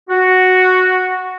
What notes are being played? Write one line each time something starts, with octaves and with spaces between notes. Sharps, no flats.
F#4